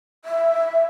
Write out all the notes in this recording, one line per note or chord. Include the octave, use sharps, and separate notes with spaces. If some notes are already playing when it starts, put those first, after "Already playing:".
E5